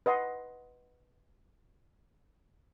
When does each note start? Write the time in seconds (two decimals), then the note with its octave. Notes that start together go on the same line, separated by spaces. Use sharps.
0.06 B4 D#5 F#5 C6